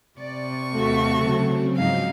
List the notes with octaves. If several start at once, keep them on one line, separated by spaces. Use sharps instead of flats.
C3 D5 C#6
D#2 A3 F#4 A4 F5 B6
C#3 F#3 C4
G#2 F3 D#4 F5